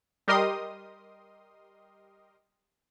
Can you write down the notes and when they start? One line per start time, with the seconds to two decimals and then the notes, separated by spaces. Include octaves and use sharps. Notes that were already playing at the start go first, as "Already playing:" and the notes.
0.28 G3 G4 A#4 D#5 C6 D#6